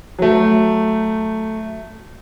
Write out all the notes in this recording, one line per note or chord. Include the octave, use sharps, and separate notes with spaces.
F#3 A3